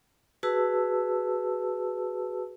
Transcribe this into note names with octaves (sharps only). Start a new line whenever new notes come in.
F#4 G#4 B4 A5 E6